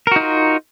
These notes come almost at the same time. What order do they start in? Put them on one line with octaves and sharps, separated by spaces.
A#4 F#4 D#4 F4